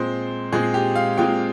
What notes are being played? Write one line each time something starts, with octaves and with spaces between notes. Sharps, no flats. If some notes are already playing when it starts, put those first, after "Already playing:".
Already playing: A#2 G#3 C4 C5
A#2 G#3 C4 G#4
G4
F5
A#2 G#3 C4 G5